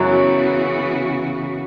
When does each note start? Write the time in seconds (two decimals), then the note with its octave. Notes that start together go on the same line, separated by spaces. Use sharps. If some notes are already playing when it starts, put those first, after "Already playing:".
Already playing: F#2 C#3 E3 F#3 B3 F#4